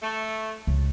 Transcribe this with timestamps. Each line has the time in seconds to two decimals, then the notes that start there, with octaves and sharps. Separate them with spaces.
0.02 A3
0.67 C#2